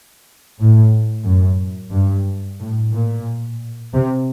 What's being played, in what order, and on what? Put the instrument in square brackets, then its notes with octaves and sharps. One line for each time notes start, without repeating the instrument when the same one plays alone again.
[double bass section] A2
F#2
G2
A2
A#2
C3